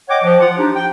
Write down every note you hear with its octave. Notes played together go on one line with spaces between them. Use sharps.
C#5 D#5 F#5 G5 D6
F3
F4 F#5
D4 D#4 G4
G5